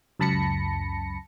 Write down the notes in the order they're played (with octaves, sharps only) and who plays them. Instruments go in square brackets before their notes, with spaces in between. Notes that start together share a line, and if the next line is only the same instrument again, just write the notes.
[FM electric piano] C#2 F#2 A5 B5 A#6 C#7